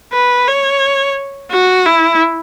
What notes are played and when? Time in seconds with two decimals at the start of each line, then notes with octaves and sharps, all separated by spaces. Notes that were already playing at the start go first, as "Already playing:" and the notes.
0.13 B4
0.48 C#5
1.52 F#4
1.86 E4